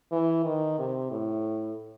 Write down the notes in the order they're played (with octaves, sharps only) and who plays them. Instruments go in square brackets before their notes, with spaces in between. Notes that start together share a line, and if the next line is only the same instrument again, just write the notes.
[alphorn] E3
D#3
C3
A2